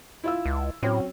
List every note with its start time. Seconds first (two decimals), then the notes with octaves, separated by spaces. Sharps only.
0.24 E4 F4 E6
0.46 C#2
0.83 A2 F#3 C4 C#4